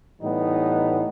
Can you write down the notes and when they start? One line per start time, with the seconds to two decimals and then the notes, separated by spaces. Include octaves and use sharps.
0.21 A2 E3 G3 B3 D#4